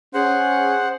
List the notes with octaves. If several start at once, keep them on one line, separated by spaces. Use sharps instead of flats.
C#4 G#4 C5 F#5